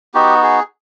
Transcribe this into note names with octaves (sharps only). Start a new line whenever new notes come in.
B3 D#4 F#4 G4
G#4